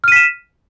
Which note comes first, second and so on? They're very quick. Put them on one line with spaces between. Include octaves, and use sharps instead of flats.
F6 D#7 B6 E7